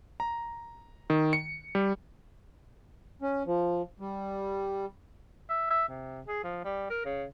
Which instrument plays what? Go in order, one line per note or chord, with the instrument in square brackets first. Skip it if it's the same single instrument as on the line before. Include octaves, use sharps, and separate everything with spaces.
[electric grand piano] A#5
D#3
C#7
G3
[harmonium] C#4
F3
G3
[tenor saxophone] E5
E5
C3
G#4
F3
G3
A#4
C#3